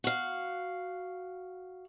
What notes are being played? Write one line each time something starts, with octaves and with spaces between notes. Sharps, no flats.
F#4 F5